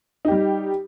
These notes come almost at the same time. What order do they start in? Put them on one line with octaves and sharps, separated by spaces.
D#4 G4 G3